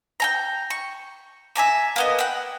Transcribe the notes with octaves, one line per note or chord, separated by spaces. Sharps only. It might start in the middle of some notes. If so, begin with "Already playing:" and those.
G5 G#5 A#5
C#6
E5 G#5 A#5 D6
A#3 B3 D#5
F#5 G5